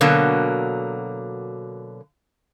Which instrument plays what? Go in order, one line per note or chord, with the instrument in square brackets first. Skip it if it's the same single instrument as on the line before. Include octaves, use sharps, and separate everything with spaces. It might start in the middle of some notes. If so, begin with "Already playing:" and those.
[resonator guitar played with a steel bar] B2 D3 F#3 A#3